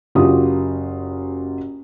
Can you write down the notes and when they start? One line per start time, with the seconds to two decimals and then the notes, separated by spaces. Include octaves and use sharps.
0.15 F#1 F#3 F4 G4 D#6